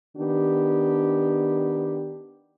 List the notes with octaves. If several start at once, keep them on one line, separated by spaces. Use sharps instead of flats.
D#3 B3 D4 G4